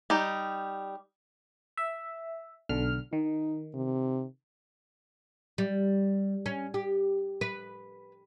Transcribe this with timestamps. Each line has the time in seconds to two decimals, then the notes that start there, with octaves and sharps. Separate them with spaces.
0.10 G3 D#4 G4
1.77 E5
2.69 B1 D3 F6
3.13 D#3 D#4
3.74 C3
5.58 G3
6.46 C#4
6.74 G4
7.41 B4